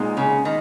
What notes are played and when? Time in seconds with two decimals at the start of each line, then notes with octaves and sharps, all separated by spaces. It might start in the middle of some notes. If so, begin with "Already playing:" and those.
Already playing: A#2 G#3 B3 D#4
0.17 C#3
0.45 D#3